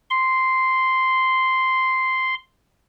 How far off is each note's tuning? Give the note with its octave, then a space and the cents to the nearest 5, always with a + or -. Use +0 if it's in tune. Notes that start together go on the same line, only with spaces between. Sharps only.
C6 -5